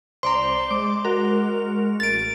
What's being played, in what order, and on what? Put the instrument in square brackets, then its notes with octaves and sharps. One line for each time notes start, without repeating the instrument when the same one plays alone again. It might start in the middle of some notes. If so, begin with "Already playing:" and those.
[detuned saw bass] C2 [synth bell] C5 D5 G7 [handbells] A#5 C6
[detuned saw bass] G#3 [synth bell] D6
[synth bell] F#4 A#4 F7
[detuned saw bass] A1 [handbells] A6 D7